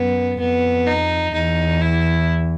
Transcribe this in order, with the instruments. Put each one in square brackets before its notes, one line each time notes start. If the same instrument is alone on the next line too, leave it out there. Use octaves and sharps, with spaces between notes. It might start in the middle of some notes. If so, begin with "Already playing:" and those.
Already playing: [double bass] F#2 [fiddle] B3
[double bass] F2 [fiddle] B3
[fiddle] D#4
[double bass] E2 [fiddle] D#4
[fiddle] E4